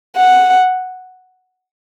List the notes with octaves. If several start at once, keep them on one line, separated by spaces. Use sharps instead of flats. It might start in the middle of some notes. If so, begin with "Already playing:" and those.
F#5